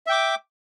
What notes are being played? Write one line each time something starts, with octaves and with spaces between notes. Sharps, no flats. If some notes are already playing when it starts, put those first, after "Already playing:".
E5 G5 D6